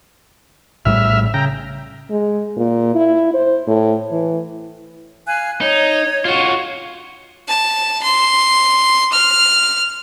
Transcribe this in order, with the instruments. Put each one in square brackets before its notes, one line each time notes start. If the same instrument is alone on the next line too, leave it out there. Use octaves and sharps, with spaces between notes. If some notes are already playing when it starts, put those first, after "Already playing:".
[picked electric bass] A#1 A2 G3 [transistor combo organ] E5 F6
[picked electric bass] C#3 [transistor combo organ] G5 A#5
[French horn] G#3
A#2
E4
C5
A2
E3
[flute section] F5 G#5 F#6
[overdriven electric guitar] D#4 [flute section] C#5
[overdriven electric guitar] F4 F#4
[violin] A5
C6
F6